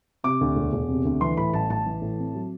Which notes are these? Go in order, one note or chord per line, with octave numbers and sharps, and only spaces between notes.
C3 D6
D2
E1
E1
C3
D2
E3 C6
A2 B5
A1 A5
A1 A5
E3
A2
C4
F#3